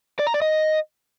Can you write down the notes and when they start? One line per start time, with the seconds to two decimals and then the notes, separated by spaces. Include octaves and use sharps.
0.19 D5
0.27 A#5
0.34 D5
0.42 D#5